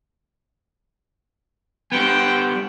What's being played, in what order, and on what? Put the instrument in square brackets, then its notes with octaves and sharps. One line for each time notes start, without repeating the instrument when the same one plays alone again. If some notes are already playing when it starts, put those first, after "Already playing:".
[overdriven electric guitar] G3 B3 [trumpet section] C5 F#5 G5